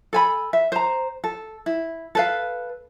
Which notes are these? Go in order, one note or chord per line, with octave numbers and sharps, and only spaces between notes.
A4 G#5 B5
E5
C5 A#5
A4
E4
A4 B4 F5